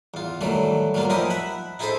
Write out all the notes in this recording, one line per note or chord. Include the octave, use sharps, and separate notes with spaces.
E2 F4
D#3 E3 F#3 G3 A3
F#3 G3 A#3 F4
F3 D#4 E4 G4 A#4 D#5
E5 F#5 B5
D#4 E4 G#4 A4 C5 E5